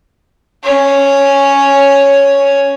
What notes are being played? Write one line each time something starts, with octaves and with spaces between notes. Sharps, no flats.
C#4 C#5